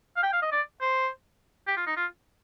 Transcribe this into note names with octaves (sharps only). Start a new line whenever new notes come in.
F5
G5
F5
D#5
D5
C5
G4
F4
D#4
F4